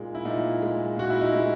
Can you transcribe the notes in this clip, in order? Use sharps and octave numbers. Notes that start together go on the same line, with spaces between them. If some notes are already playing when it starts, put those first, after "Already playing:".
Already playing: A#2 G#3 D#4
E4
A#2 D#4
G#3
A#2 F#4
E4
D#4
G#3 E4